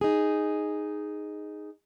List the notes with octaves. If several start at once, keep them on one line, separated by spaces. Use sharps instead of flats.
D#4 G#4